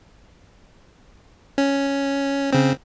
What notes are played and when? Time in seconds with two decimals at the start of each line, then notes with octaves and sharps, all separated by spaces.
1.58 C#4
2.53 C#3 C4